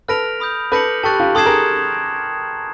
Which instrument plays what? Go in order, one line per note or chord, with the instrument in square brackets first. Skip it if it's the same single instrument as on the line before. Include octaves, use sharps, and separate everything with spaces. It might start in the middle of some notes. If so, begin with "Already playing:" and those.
[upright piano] A4 B4 [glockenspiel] F6 A#6 D7 F7
[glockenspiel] B5 D#6 G6
[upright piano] A4 B4 [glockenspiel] D6 G6 A#6 C#7 F#7
[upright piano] G4 A4 [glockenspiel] A5 C#6 F#6 A6
[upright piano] F4 G4
[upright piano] G4 A4 [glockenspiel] C6 D#6 G#6 C7 E7
[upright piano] G#4 A#4